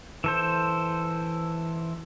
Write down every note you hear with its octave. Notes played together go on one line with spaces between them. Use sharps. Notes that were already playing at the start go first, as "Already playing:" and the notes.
E3 A4 C5